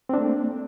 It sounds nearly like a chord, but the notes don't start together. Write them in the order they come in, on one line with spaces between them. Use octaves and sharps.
C4 D4 A3 A#3